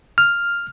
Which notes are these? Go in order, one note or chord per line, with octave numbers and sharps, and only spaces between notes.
F6